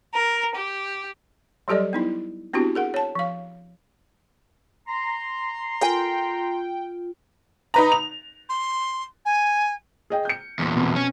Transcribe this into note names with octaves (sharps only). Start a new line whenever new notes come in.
A#4
G4
F#3 G3 G4 A4 D5 D#5
B3 D#4 E4
B3 C4 D4 E4 F#4 G4
G#4 A#4 F#5
C#5 A5
F3 F5
A#5 C6
F4 A4 A#4 G5 G#5
D#4 B4 A#5
F7
C6
G#5
G#4 D#5 G5
G6 C#7
E2 A#2
F2 B2
C#4